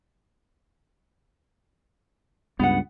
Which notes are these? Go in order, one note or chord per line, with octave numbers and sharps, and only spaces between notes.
C#2 G2 B3 F#5